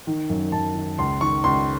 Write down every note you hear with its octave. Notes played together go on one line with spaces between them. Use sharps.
D#3
F#2
F#2 A5
D#3
C#2 C6
D#3 C#6
C#2 C6